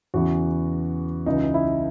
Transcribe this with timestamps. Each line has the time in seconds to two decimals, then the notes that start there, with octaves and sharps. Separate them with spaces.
0.14 E2 C#3 E3 F#4
1.26 C#2 C#3 E3 D#4
1.54 E4